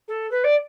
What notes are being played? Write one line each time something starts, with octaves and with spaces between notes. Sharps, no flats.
A4
B4
D5